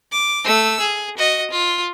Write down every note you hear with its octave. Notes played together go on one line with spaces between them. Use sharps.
D6
A3 E6
G#4
F#4 D#5
F4